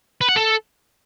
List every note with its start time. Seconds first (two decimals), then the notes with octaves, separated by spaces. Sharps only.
0.21 B4
0.29 F#5
0.36 A4